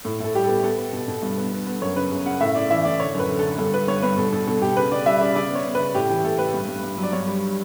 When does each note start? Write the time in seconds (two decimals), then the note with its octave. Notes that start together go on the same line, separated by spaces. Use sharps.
0.05 A2
0.20 A2 A4
0.34 G3 G4
0.44 B3 A4
0.64 B3 A4
0.78 B3
0.93 B2
1.08 B2
1.22 G2
1.38 B3
1.52 B3
1.67 B3
1.82 F#2 C#5
1.96 C#3 B4
2.11 C#3
2.26 C#3 F#5
2.41 A2 E5
2.55 A2 D5
2.70 E3 E5
2.85 A2 D5
3.00 D3 C#5
3.15 F#2 B4
3.29 D3
3.39 A4
3.44 D3
3.58 G2 A4
3.74 G2 B4
3.88 G2 C#5
4.02 G2 B4
4.18 B2 A4
4.33 B2 A4
4.47 B2 A4
4.62 B2 G4
4.76 C#3 B4
4.91 C#3 D5
5.06 G3 E5
5.21 C#3 D5
5.35 C#3 D5
5.50 B3 C#5
5.65 B3
5.75 B4
5.80 C#3
5.94 A2 G4
6.09 E3 G4
6.24 A2 A4
6.39 A3 B4
6.54 G2
6.68 G2
6.83 G2
6.98 F#3
7.03 D5
7.13 G2 C#5
7.27 G3